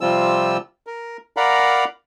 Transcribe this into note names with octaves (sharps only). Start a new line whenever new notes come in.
C3 F3 G3 C4 F4 E6
A#4
A#4 D5 F5 F#5 A#5 B5